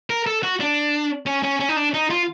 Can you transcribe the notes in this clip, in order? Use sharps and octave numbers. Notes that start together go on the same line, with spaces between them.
A#4
A4
F#4
D4
C#4
C#4
C#4
D#4
D4
D#4
F4